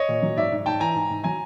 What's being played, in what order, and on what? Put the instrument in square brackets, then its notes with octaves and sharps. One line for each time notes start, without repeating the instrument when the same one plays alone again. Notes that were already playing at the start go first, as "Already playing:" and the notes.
Already playing: [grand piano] C#5 D#5
A#2
F#3
G#2 D5 E5
G#2
G#2 G5 A5
E3 G#5 A#5
G#2
G#2
F#3 G#5 A#5